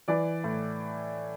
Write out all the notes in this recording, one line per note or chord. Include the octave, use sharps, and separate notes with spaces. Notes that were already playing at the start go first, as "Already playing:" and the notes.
E3 D5
A2